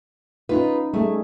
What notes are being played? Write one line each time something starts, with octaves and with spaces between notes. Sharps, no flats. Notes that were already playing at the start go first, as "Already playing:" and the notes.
C#4 D#4 F4 B4
G3 A3 G#4